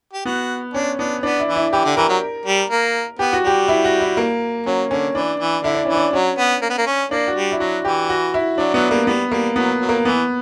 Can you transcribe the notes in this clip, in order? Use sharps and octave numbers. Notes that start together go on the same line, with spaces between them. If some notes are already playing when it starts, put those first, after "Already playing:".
G4
B3 F#4
C#4 D4
B3 D4
B3 D4
E4
E3
E4
E3 G4
D3
E3 A#4
F#3
G3
A#3
B3 G4
F#4
G3 G4
E4
F#4
E4
A#3
F#3 C#4
D3 C#4
E3 D4
E3
D3 E4
D4
E3 C#4
D4
F#3 C#4
B3
A#3
B3
A#3
C#4
A#3 D4
F#4
G3
E4
F#3 F#4
E3 G4
F#4
E4
F#3 D4
F#3 B3
G3 A#3
G3 B3
G3 A#3
F#3 B3
F#3
A#3
E3 B3